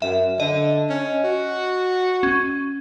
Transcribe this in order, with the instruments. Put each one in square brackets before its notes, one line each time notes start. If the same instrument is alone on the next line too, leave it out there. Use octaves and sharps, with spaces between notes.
[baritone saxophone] F#2 [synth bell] E5
[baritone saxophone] D3 [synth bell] D#5
[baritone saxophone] C#4
F#4
[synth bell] C#4